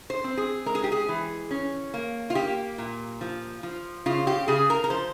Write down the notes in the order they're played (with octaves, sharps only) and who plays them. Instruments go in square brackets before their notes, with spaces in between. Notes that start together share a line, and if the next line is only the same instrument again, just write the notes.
[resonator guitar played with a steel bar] C5
C4
G#4
G#3 A#4
G#4
G4
G#4
E3
C#4
A#3
F4
A#3 G4
A#2
F3
F3
C#3 F4
G4
C#3 G#4
A#4
A#4
F3 C5